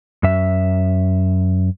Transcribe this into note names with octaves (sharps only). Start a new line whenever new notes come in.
F#2 E5